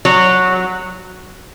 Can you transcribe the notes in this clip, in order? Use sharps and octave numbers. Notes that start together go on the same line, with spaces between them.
F#3